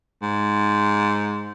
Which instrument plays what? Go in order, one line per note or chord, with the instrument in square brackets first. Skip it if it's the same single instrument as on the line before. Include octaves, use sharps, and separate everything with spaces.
[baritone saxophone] G#2